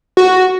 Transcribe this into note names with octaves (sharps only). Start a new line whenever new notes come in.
F#4